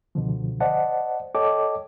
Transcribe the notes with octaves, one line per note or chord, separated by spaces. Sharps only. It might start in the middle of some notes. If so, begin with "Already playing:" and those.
C#2 B2 D3 F3
C5 D5 D#5 F#5 A5
A4 C#5 D#5 G5 A5 D6